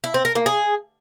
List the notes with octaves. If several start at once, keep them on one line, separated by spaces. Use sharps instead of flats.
E4
C4
A#4
A#3
G#4